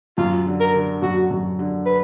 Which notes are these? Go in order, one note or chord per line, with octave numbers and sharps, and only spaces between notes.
F#2 F4
D3
A#4
D3
F#2 F#4
F#2
D3
B4